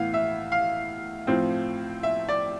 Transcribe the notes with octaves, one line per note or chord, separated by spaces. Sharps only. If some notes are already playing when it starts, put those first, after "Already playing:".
Already playing: A2 E3 B3 F5
E5
F5
A2 F3 C4
E5
D5